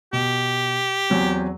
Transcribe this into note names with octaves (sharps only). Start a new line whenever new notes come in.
B2 G4
E2 F#3 C4